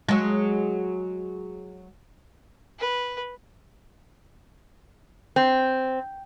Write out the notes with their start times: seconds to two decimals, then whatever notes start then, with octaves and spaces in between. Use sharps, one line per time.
0.09 F#3 G#3
2.79 B4
5.36 C4